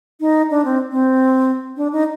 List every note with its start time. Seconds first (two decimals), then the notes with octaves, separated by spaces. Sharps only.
0.20 D#4
0.51 D4
0.65 C4
0.91 C4
1.77 D4
1.92 D#4